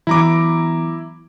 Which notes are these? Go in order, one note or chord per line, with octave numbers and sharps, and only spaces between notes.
E3 F#3 B3 E4 A#5 D6